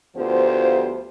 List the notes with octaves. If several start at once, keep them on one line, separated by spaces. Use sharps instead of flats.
D2 F3 B3 F4 G4 C5